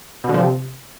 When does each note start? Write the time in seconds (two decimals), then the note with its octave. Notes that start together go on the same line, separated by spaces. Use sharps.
0.24 B2
0.29 D3
0.34 F3
0.39 C3